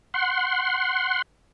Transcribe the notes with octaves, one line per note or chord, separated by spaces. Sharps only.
F#5 C6